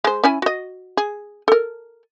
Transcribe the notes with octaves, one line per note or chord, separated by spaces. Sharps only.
G#3 C5
C#4 E4 G#5
F#4 D#5
G#4
A4 A#4